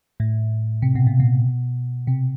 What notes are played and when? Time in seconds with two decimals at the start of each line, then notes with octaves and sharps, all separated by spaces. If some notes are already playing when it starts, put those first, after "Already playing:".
0.20 A2
0.82 C3
0.95 B2
1.07 A#2
1.20 B2
2.07 C3